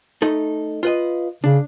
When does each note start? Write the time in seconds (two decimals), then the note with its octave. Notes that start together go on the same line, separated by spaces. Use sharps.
0.22 A3 D#4 A4
0.83 F4 B4 D#5
1.44 C#3 D4